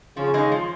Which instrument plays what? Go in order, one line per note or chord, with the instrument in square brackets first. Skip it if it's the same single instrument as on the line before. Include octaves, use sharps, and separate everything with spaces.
[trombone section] C#3 C#4 [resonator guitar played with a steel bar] F3
[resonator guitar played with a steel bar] G#3 D#4 G#4
F3